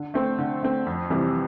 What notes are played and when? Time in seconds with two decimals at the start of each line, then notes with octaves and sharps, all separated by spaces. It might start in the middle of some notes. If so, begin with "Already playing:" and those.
Already playing: D3
0.14 A3 C4
0.38 D3
0.63 A3 C4
0.86 F2
1.10 C3 E3 G3